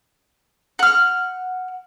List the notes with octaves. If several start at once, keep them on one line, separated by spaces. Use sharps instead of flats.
F#5 F6